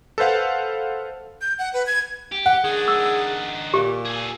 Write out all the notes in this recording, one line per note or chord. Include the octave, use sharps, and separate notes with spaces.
A4 B4 C5 F5 F#5
G6
F#5
B4
G#6
G4
F#5
D#3 D4 G#4
E6
A#2 G4
G#4 A4